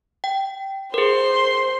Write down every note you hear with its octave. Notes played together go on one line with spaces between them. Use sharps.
G5
G#4 A#4 C5 C6